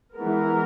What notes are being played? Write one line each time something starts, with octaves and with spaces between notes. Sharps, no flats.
E3 G#3 B3 A#4